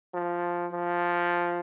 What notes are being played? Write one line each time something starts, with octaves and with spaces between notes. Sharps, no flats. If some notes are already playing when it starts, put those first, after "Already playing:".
F3
F3